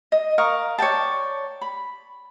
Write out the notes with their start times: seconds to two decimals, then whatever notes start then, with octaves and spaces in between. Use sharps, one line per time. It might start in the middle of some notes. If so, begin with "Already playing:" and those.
0.12 D#5
0.38 A#4 F5 C#6 D#6
0.78 C#5 D5 G5 A5
1.61 B5